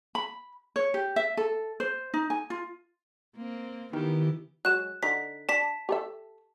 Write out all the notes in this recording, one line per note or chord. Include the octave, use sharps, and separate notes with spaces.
B5
C#5
G4
E5
A4
C5
D#4
G#5
F4
A#3 C4
D#3 E3 B3 G4
F#3 G#3 F#6 E7
D3 D#4 B6
D4 A5 B6
G4 A4 E5